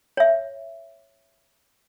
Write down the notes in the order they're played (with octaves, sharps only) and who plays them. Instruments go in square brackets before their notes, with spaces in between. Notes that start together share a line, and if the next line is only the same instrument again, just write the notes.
[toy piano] C#5 E5